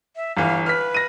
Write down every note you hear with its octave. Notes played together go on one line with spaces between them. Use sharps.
E5
G1 E3 F5
B4 F6 B6
A#6 D#7